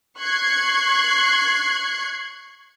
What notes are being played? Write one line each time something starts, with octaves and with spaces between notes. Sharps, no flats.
C#6 F#6 G#6 C7